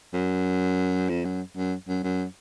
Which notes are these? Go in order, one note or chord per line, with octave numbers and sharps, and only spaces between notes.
F#2
F2
F#2
F#2
F#2
F#2